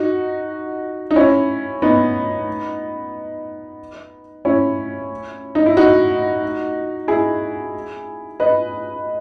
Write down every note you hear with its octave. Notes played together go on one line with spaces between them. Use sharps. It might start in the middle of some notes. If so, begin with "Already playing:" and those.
Already playing: D#4 F#4
D#4
C#4 E4
B3 D#4
C#4 E4
D#4
E4
D#4 F#4
E4 G#4
B4 D#5